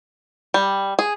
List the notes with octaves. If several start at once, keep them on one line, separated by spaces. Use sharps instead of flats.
G3
G#4